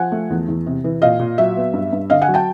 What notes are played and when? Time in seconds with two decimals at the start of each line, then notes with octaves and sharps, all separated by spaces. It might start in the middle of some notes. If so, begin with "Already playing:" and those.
Already playing: F3 F#5 G#5
0.12 A3
0.30 E2
0.48 E2
0.67 C3
0.84 E3
1.02 A#2 D#5 F5
1.19 A#2
1.38 F#3 E5
1.57 B3
1.74 G2
1.93 G2
2.10 D3 D#5 F5
2.22 F#5 G#5
2.28 F#3
2.34 G5 A5